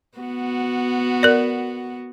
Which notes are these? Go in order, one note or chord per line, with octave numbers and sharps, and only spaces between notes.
B3 F#4
A#4 D5